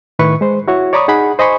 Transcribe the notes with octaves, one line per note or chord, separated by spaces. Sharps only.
A2 D#3 E4 B4 C#6
G#3 C5
E4 F#4 C#5
C#5 D5 A#5 B5 C#6 D#6
D#4 G#4 F#5 B5
C5 D#5 G#5 B5 C#6